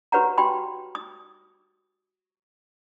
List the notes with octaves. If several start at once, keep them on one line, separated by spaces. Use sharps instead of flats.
F#4 G4 B4 C#5 F#5 A#5
F#4 G4 G5 B5 C6
D#6